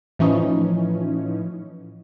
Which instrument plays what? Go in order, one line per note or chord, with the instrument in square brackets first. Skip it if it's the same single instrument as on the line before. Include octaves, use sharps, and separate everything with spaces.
[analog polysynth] A2 E3 F3 C#4 D#4